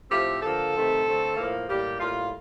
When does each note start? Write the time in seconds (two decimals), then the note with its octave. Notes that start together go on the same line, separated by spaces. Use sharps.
0.11 A2 F3 A3 C4 G4
0.42 D3 F3 A#3 A4
0.74 C3 D#3 A3 C4
1.05 D3 A3 C4
1.37 A2 F3 A#3
1.68 A2 G3 A#3 G4
2.00 A2 G3 A#3 F4